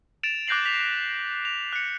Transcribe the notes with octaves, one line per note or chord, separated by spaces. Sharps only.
A6 D7 E7 F7
D6 F#6 G6 A#6 C7 F#7
B6 F7
F7
F#6 C#7